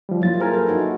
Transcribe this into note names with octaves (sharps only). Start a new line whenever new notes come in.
F3 G3
F#3 A#3 E4 F4 A6
E4 G#4 A#4 C5 G#5
A4 B4
A#3 D#4 F#4